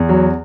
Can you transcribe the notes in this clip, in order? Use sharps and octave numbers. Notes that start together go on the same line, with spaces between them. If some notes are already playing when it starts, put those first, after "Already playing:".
Already playing: E2
F#3